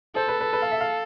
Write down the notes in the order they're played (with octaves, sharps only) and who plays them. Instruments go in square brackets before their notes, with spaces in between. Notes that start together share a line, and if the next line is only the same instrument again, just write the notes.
[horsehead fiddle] A4 [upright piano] C5
[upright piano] B4
B4
B4
F5
E5
F5